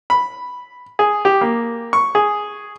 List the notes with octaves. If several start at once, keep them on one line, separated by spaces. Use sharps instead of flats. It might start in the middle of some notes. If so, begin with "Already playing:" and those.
B5
G#4
G4
A#3
C#6
G#4